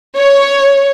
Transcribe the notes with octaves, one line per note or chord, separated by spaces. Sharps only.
C#5